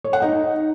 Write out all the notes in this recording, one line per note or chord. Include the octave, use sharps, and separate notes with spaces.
C#5
F#5
D#4